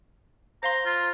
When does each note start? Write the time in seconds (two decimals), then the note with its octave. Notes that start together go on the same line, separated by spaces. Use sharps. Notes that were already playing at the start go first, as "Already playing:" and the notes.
0.63 C5 F5 A#5 C6
0.86 F4